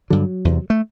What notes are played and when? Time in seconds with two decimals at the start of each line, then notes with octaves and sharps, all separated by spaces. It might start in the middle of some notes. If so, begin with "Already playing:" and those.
0.10 G2 D3 F#3
0.45 E2 C3
0.70 A3